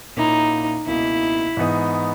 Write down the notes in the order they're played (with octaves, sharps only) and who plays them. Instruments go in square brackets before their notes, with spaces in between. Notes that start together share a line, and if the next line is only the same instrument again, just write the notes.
[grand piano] A#2 A#3 C#4 E4 [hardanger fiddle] D#4
[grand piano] C#2 B2 A#3 D#4 [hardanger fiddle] E4
[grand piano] G#2 E3 B3 D#4